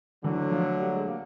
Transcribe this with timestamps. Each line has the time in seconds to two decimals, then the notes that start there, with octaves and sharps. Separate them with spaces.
0.24 D2 D3 E3 F#3
0.52 F3
0.80 G3
0.94 G#3
1.08 A#3